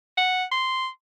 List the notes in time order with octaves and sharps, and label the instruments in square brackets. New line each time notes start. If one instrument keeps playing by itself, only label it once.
[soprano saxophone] F#5
C6